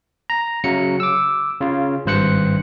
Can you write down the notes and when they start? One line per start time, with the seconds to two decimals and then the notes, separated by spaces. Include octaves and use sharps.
0.30 A#5
0.64 C#3 F#3 C#7
1.00 D6 E6
1.61 C#3 F4
2.06 G#1 G2 C5 F#6 C#7